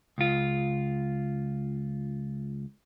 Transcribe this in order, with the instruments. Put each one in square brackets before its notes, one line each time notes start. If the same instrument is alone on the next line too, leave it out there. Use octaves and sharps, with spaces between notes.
[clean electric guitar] C#2 F4